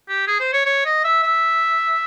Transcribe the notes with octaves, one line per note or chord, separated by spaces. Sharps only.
G4
G#4
C5
C#5
C#5
D#5
E5
E5